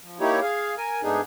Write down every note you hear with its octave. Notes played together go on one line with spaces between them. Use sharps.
F3
A#3 D#4 E4 G4 C#5
G#4 F5
A#4 G#5
G#2 A3 B3 D4 D#4 G#4